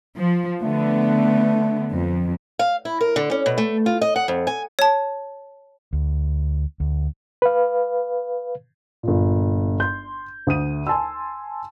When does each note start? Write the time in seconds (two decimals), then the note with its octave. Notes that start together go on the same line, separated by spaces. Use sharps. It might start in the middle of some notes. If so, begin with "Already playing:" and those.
0.18 F3
0.62 D3 A3 B3
1.92 F2
2.59 F5
2.85 E4
3.01 A#4
3.16 D3
3.31 C#4
3.46 B2
3.58 A3
3.86 F4
4.01 D#5
4.16 F#5
4.28 F2
4.47 G#5
4.79 C#5 A5
5.93 D2
6.80 D2
7.42 B4 F5
9.03 G1 A#2
9.80 C6 G6
10.47 D2 D#6 D#7
10.87 G#5 A5 C6 E6